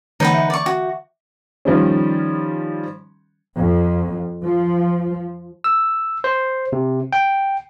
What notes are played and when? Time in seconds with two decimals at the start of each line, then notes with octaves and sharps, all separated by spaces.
0.20 D3 E3 D#4 B4 F#5 G6
0.34 E5
0.50 D5 C#6
0.66 F#4
1.65 D#3 F3 G3 C#4
3.58 F2
4.44 F3
5.64 E6
6.24 C5
6.73 C3
7.13 G5